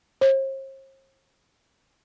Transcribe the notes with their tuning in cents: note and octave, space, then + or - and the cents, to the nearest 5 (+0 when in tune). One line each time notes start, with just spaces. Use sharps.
C5 +45